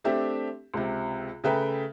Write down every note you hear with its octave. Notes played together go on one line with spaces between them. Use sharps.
A3 C4 D4 G4 E5
C#2 C3
C#3 A3 B4 E5 G5 A#5